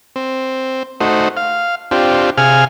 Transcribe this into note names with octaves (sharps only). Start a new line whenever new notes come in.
C4
A3 D#4 F#4 C5
F5
C4 D4 F4 G4
C3 G#4 F5 G#5 F6